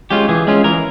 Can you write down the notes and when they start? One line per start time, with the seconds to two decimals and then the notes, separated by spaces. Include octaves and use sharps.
0.11 G#3 C#4 F4 G4
0.29 E3 G#4
0.47 G#3 C#4 F4
0.64 E3 A#4